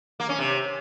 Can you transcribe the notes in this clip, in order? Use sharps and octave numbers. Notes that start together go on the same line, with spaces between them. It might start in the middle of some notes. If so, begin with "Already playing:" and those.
A#3
C#4
C3